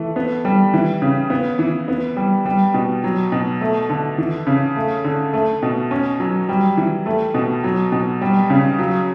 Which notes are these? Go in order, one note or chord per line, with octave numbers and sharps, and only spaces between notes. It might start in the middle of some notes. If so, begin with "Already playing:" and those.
Already playing: E3 A3
B3
G3
E3
C#3
B3
E3
B3
G3
G3
B2
F#3
B2
A3
D3
E3
C#3
A3
D3
A3
B2
C#4
F#3
G3
E3
A3
B2
F#3
B2
G3
C#3
F#3